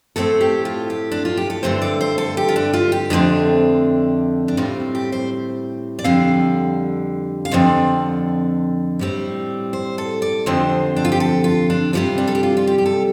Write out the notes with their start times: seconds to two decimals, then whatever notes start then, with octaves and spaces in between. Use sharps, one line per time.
0.16 A2 A3 C4 A4
0.41 G4
0.65 F4
0.90 G4
1.12 D4
1.25 F4
1.37 G4
1.50 A4
1.63 G2 D3 A3 C4 C5
1.82 D5
2.01 C5
2.18 A4
2.37 G4
2.49 F4
2.56 D4
2.73 F4
2.92 G4
3.10 F2 D3 A3 C4 D4
4.48 D4
4.57 A2 G3 C4 F4
4.95 G4
5.12 C5
5.99 D5
6.04 F2 D3 G3 C4 F5
7.45 F5
7.51 F2 D3 F3 C4 D5
8.99 A2 G3 C4
9.73 C5
9.98 A4
10.22 D5
10.46 F2 D3 F3 C4 C5
10.96 D4
11.05 F4
11.12 G4
11.20 A4
11.44 F4
11.70 D4
11.93 C3 G3 C4 F4
12.18 D4
12.28 A4
12.35 G4
12.43 F4
12.57 F4
12.67 G4
12.78 G4
12.86 A4